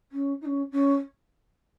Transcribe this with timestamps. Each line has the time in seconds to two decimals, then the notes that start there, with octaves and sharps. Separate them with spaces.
0.12 C#4
0.41 D#4
0.45 C#4
0.71 C#4